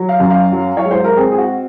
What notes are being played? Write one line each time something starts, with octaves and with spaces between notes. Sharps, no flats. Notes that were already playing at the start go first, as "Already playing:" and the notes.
Already playing: F#3
F5
F#2
F5
F#3
C#5
G#2
C5
A#4
C4 G#4
G#4
F#4